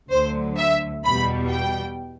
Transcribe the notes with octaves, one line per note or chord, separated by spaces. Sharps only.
D2 D3 F#3 C5
E5
E2 B2 G3 B5
G5